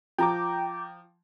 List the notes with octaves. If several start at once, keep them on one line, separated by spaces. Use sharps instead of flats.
F3 G5 A#5 D6